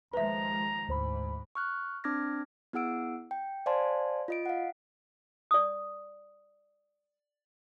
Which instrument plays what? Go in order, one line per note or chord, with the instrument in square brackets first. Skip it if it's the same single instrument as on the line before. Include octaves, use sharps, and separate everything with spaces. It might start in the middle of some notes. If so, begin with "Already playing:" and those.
[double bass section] D#2 F3 G#3 [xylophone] B4 E5 [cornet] A#5
[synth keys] D2 C5 B5 [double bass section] G#2
[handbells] C#6 F6 F#6
C4 D4 D6 F6 G#6 A#6
[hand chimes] B3 E4 G#4 F#5 E6 D7
G5
C5 D5 F5 G#5 A5 C6
F4 D#5 D7
F5 F#5
[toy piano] D5 D#6